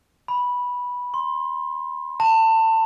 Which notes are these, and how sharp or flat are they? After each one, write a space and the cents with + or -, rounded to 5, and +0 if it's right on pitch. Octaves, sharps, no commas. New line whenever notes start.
B5 -10
C6 +20
A5 +25